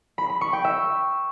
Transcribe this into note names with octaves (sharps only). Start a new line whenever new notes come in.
B5
B5
C#6
G5
E5